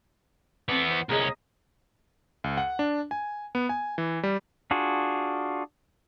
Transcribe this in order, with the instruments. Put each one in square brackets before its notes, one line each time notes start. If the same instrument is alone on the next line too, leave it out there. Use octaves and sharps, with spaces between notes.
[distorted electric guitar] E3 B3 [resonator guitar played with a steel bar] A3 C4
[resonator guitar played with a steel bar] C5
[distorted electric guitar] C2 C#4 [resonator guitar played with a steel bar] A#3 G#4 D#5
[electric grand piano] C#2
F#5
D4
G#5
B3
G#5
E3
G3
[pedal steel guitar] D4 F4 F#4 G#4